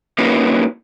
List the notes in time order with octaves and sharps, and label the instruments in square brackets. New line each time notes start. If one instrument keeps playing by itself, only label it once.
[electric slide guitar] A#3 C#4 D#4 E4 F#4 B4